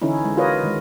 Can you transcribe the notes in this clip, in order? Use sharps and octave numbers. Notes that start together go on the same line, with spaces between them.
D3 E3 C#4 D#4 E4
G#3
F4 F#4 A#4 B4 C#5 D#5
D#3 G#3